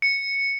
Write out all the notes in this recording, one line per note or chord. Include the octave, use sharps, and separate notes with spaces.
C#7